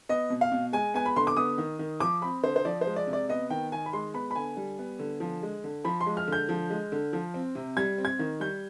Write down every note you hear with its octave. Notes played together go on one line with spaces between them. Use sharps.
B3 D#5
B2
F5
B2
G#3 G#5
B3 G#5
B5
D3 C6
D6
B3 D#6
D#3
D#3
F3 D6
C4 B5
D3 C5
C5
F3 D5
C5
G#3
D5
C3
D5
B3 D#5
D#3 G5
D#3 G#5
B5
G#3 C6
B3 B5
B5
D3 G#5
G3
B3
D3
F3
G#3
D3
F3 B5
C6
G#3
F6
D3
G6
F3
G#3
D3
F3
C4
C3
G3 G#6
C4
G#6
D#3
G3 G6